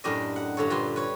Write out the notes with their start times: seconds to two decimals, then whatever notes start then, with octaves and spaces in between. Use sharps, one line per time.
0.04 F#2 A2 D4 G4 D#5
0.36 F#5
0.57 G2 D3 A4 C#5
0.70 A#2 G3 B4 C6
0.96 B4 C#5